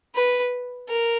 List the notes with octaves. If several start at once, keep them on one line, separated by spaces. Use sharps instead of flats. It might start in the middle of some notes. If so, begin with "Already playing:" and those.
B4
A#4